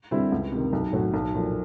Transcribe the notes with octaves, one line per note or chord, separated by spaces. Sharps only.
D3 G3 C4 E4
C#2
C3 D#3
B1
A2 F#3
B1
A#2 F3 A3